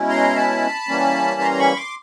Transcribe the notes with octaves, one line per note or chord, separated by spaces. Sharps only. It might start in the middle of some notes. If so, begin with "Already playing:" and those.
Already playing: B2 G#3 C#4 E4
A#5 C6
A5 B5
E3 G3 A#3 C#4
A#5 C6
B5 C#6
C6 D6